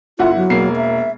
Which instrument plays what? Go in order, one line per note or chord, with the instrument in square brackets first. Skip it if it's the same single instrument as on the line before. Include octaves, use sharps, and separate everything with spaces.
[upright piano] G1 E4 F#5 [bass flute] F4
[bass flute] F#3
[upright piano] E1 A#3 C7
[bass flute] E5